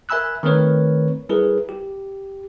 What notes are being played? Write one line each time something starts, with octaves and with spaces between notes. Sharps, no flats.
A#4 E5 G#5 B5 E6 F#6
D#3 A3 C4 A#4 B4 C#5
G3 E4 G#4 A#4 B4
G4